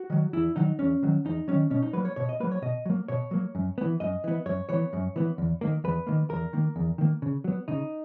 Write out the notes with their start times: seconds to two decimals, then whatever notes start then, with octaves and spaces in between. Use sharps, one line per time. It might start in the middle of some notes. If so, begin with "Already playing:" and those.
Already playing: F#4
0.10 D#3 F#3
0.33 E2 E4
0.56 D#3 F#3 D#4
0.79 E2 C#4
1.03 D#3 F#3
1.25 E2 D#4
1.48 D#3 F#3 C#4
1.70 B2 C#4
1.82 D#4
1.93 F#3 A#3 B4
2.05 C#5
2.16 B2 C#5
2.29 D#5
2.40 F#3 A#3 B4
2.52 C#5
2.62 B2 D#5
2.86 F#3 A#3
3.08 B2 C#5
3.31 F#3 A#3
3.55 F#2
3.78 E3 B3
4.00 F#2 D#5
4.24 E3 B3
4.46 F#2 C#5
4.69 E3 B3 C#5
4.93 F#2
5.16 E3 B3
5.38 E2
5.61 D#3 A#3
5.84 E2 B4
6.07 D#3 A#3
6.30 E2 A#4
6.53 D#3 A#3
6.76 E2
6.98 D#3 A#3
7.22 C#3
7.44 F#3 B3
7.68 C#3 D#4